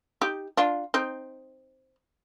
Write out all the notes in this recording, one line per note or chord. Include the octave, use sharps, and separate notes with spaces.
D#4 G4
D4 F4
C4 D#4